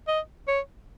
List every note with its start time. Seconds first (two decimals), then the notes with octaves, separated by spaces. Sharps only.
0.07 D#5
0.48 C#5